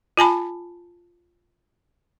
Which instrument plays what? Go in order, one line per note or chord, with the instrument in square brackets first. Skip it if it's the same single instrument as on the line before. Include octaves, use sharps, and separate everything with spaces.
[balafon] F4 G#5 A5 B5